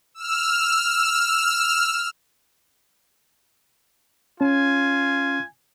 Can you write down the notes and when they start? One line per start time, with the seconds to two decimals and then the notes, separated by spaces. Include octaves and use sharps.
0.14 E6 F6
4.41 C#4 F4 G#5